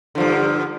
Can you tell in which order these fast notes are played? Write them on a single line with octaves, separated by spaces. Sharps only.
D3 F3 G2